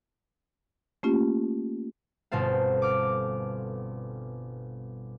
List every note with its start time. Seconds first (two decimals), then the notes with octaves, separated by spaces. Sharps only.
1.03 A3 A#3 C#4 F4 G4
2.32 G1 B2 C4 A4 F5
2.82 D6 F6